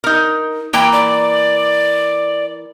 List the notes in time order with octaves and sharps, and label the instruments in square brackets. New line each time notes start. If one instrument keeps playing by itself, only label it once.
[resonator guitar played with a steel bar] D#4 A#4
[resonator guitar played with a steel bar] E3 A#3 A#5 [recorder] G5
[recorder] D5